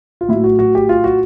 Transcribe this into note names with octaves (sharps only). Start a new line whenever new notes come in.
F4
A2 F#3 E4
F#4
F#4
G4
F4
F#4